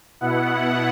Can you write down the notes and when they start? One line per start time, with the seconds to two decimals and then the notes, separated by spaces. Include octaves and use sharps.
0.21 B2 B3 E4 F#5